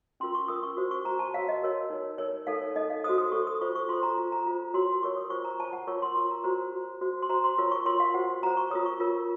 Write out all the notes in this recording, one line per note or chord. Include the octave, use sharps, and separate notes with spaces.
C#4 F4 A#4 C6
C#6
C#4 F4 A#4 D#6
C#6
F#4 C5
C#6
F#4 C5 A#5
A5
F#4 A#4 C#5 F5
D#5
F#4 A#4 C#5
D#4 A#4 C#5
D#4 A#4 C#5
D#4 A4 C#5 F5
C#5
D#4 A4 C#5 D#5
F5
F#4 A4 C5 D#6
D#6
F#4 A4 C5 C#6
D#6
F4 A4 C5 C#6
C#6
F4 A4 C5 C6
A#5
F4 C5
A#5
F4 C5
F#4 A#4 C#5 C6
C6
F#4 A#4 C#5 C#6
D#6
F4 C5 C#6
A#5
F4 C5 A5
F#5
F4 A#4 C#5 C#6
C6
F4 A#4 C#5 C#6
A#5
F#4 C5 A#5
F#4 C5
F#4 C5
C6
F#4 C5 A#5
C6
F4 A#4 C#5 C#6
C#6
F4 A#4 C#5 C6
F5
F#4 C5 F#5
F#4 C5 A#5
C#6
F4 A#4 C#5 D#6
C#6
F4 A#4 C#5